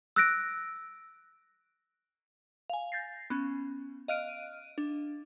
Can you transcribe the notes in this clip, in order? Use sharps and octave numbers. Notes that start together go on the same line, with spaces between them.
E6 F#6 A#6 D7
F5 G#5
G6 A6 A#6 C7
B3 C#4
D#5 F5 F6 F#6 D7 D#7
D4